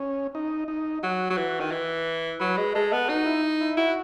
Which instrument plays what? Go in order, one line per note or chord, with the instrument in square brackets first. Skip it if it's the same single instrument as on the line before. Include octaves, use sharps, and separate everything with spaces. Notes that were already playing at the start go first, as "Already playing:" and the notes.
Already playing: [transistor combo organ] C#4
D#4
D#4
[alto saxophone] F#3 [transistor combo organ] F#4
[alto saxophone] F#3
E3
D#3
E3
[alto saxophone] F#3 [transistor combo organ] B4
[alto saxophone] G#3
[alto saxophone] G#3 [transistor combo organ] A4
[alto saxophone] B3
[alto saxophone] D#4 [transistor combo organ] F#4
[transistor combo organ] E4
E4
[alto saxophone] E4 [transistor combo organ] F#4